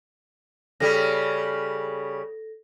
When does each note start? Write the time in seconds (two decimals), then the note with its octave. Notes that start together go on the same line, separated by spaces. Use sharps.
0.80 C#3 G3 A4 A#6